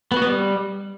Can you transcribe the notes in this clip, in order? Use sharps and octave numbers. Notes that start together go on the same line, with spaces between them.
B3
F#4
B3
G3